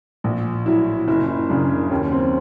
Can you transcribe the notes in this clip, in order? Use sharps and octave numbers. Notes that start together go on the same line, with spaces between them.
A#1
A2 F#3 E4
F#1 E4
F#2 C#3 D4
D#2 C#4
C4